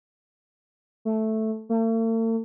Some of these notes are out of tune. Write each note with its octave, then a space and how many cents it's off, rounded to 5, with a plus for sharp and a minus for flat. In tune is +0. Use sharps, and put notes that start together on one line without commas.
A3 -5
A3 +45